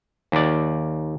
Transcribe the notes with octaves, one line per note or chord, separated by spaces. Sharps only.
D#2 D5